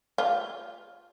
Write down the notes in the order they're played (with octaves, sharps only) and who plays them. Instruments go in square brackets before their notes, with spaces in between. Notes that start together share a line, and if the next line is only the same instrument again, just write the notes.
[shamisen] F4